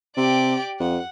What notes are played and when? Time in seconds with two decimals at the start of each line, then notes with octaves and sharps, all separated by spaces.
0.17 C3 G4 D5
0.80 F2 F#5